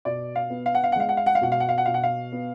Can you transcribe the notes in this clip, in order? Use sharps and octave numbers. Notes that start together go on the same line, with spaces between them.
B2 D5
F5
B3
F5
F#5
F5
F#5
G#3 F5
F#5
F5
F#5
F5
B2 F#5
F5
F#5
F5
F#5
B2 F5
F#5
F5
B3